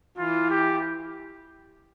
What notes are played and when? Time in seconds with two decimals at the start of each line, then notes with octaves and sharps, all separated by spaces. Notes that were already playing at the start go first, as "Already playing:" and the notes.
0.18 E3 F4
0.50 G4